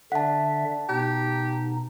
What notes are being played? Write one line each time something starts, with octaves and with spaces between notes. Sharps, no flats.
D3 D4 E5 F#5 A5
B2 D#4 G4